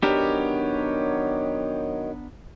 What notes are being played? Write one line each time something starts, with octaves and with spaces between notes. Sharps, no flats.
D#3 F#3 B3 D4 D#4 G4 A#4 C#5